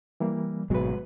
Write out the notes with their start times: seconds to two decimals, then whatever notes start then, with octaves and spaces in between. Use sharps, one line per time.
0.20 E3 G3 A#3
0.70 G#1 B2 F#3 G#3 B4